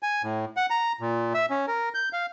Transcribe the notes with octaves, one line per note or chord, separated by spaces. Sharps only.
G#5
A2
F#5
A#5
A#2
E5
C#4
A#4
G6
F5